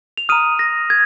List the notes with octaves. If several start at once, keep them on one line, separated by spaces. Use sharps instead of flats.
F7
A#5 D#6 F6 D#7
A#6
G#6